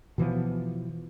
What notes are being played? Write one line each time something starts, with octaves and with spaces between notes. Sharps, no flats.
B2 E3 F3 B3